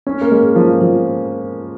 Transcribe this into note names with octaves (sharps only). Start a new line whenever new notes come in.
C#4
A#3
G#3
F3
F3